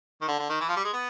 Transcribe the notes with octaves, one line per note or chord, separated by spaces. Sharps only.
D#3
D3
D3
D#3
E3
F3
G3
G#3
B3